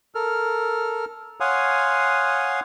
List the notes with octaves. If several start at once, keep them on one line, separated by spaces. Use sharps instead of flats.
A4 A#4 F6
C#5 F5 F#5 G#5 C6 D#6